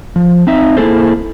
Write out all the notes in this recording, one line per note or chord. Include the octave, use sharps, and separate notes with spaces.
F3
C4 D#4 E5
A#3 E4 G#4 A4 C5